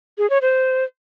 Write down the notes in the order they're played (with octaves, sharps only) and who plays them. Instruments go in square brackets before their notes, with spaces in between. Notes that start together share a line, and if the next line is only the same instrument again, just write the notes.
[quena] G#4
C#5
C5